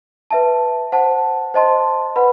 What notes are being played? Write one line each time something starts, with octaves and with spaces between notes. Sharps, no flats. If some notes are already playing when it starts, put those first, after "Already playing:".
B4 E5 A5
C5 F#5 A5
C5 D#5 A5 C6
B4 F#5 B5